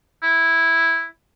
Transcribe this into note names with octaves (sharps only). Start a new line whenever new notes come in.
E4